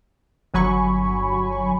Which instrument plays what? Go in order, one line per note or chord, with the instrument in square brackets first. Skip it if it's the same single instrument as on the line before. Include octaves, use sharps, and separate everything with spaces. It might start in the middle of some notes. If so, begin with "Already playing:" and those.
[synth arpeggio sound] G1 F#3 G#5 B5 C#6